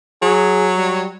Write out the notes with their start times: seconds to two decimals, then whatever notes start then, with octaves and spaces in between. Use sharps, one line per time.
0.22 F#3 G#4
0.76 G3